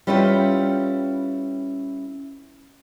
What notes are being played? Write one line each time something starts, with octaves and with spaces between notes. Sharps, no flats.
G3 C#4 E4 F4 B4 G5